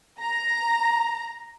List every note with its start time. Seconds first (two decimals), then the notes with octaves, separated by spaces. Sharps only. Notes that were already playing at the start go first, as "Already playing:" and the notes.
0.19 A#5